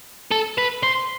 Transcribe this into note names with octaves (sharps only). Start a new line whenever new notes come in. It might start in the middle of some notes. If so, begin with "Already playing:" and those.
A4
B4
C5